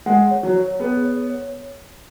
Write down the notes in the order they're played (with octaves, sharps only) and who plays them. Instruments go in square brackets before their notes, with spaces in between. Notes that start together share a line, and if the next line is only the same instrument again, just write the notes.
[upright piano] G#3 [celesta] F#5
[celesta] C#5
[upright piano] F#3
[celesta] C#5
[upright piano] B3 [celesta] G#4
[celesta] C#5
C#5